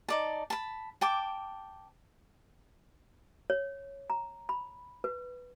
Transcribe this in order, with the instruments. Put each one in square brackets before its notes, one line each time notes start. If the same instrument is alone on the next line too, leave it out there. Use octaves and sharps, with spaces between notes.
[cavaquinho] D#4 D5 A5
A5 B5
G5 A5 D6
[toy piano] C#5
A#5
B5
B4